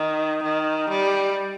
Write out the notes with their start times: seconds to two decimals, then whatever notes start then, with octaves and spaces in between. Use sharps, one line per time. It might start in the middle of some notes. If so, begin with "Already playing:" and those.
Already playing: D#3
0.43 D#3
0.89 G3